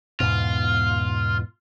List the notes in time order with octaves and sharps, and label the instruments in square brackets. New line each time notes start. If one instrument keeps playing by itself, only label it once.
[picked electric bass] E2 G#2 B2 [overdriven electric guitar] F4